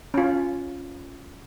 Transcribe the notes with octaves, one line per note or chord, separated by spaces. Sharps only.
C#4 F4